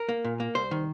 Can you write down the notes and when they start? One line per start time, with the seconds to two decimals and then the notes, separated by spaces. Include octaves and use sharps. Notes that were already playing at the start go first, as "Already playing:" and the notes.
Already playing: A#4
0.09 A#3
0.25 A#2
0.40 A#3
0.55 C2 C5
0.71 D#3